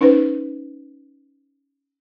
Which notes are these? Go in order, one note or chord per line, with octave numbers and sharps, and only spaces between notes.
C#4 D#4 B4 C5